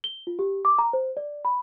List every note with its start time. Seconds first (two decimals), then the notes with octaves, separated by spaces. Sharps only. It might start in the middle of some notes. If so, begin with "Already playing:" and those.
0.04 G7
0.27 F4
0.39 G4
0.65 D6
0.79 A#5
0.93 C5
1.17 D5
1.45 B5